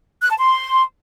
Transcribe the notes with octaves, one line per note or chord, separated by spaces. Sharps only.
F#6
A5
C6